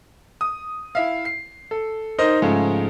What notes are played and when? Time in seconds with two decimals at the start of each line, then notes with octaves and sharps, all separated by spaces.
0.41 D#6
0.95 E4 E5 F5
1.25 C7
1.71 A4
2.18 D#4 A#4 C5 D#5
2.42 G#2 C#3 F3 G#3 A3